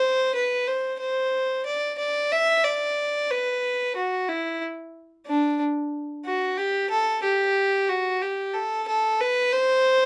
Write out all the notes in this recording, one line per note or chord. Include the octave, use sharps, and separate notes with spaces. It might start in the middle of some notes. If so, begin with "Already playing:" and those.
Already playing: C5
B4
C5
C5
D5
D5
E5
D5
B4
F#4
E4
D4
F#4
G4
A4
G4
F#4
G4
A4
A4
B4
C5